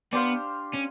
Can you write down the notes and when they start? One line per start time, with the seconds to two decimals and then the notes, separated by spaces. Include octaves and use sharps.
0.13 B3 D4 G4 C5 F5
0.74 C#4